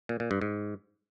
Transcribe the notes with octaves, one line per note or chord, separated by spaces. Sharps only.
A#2
A#2
G2
G#2